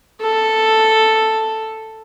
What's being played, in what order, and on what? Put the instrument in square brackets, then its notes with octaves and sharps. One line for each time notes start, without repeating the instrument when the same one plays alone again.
[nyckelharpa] A4